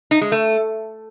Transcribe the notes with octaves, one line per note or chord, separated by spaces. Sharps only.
D#4
G#3
A3